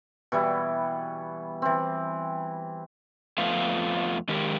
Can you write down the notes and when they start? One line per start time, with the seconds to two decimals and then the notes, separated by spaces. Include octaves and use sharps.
0.32 B2 E3 G3 E4
1.62 E3 C4
3.38 F2 A3 B3 F4
4.28 D#3 G#3 G4 A#4